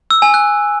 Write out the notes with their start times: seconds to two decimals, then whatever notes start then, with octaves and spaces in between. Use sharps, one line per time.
0.10 E6
0.22 G#5
0.34 F#6